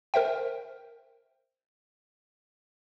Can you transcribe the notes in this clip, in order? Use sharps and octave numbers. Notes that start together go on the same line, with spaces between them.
A#4 C5 E5 G5